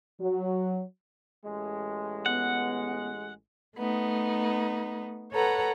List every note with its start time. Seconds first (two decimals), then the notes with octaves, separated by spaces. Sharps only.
0.21 F#3
1.44 A1 G#3
2.26 B3 F#5
3.76 A3 B3 D#4
5.33 A4 B4 C#5 F#5 A#5